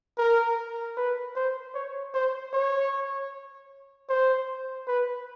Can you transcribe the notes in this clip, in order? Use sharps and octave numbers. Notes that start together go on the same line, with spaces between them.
A#4
B4
C5
C#5
C5
C#5
C5
B4